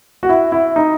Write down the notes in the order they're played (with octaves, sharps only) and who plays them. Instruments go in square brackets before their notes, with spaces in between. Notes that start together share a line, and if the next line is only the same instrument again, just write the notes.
[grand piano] F#4
E4
E4
D#4